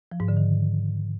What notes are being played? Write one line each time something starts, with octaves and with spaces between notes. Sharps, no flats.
F3
G#2
D3
D#3